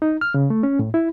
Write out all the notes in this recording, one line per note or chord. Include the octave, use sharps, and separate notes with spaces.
D#4
F6
C#3
A3
C#4
A2
E4